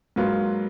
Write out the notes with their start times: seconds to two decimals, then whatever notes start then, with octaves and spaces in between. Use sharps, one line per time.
0.16 G#2 F#3 A#3 F4 B4